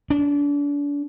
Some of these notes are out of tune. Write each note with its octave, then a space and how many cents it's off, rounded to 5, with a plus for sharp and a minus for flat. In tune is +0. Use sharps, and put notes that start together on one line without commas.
D4 -35